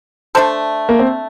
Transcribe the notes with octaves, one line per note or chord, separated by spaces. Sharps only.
A3 D4 A4 C5
A#3
C4